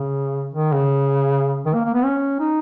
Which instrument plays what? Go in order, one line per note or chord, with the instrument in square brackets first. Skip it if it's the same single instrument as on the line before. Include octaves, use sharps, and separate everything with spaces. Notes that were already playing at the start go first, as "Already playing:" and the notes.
Already playing: [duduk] C#3
D#3
C#3
D#3
A#3
A#3
B3
C#4
D#4